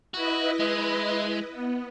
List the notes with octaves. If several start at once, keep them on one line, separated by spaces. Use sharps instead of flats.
E4 F#4 B4 D#5
G#3
B3